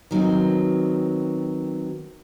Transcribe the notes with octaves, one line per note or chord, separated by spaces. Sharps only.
D#3 F#3 B3 C4